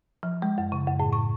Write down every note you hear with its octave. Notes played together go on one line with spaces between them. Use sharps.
F3
G#3
F#2
C#3
F#2
A2
C#6